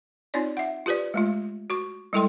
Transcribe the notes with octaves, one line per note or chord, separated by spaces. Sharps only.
C4 D#4 F4 C#5 D5
E5 F#5
F4 G4 B4 C5 D5
G#3 A3 F4
F#4 C#6
G3 G#3 E4 A4 G5 C6